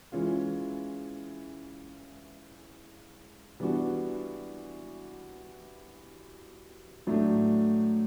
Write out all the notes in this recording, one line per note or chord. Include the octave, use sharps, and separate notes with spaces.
E3 G#3 C#4 F4
E3 G3 B3 D4 F#4
A2 F#3 A3 D4